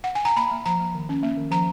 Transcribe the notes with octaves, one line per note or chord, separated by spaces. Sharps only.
F#5
G#5
A#5
A#3 B5
A#3
F3 A#5
A#3
D#3
C#4
A#3
D#3
F3 A#5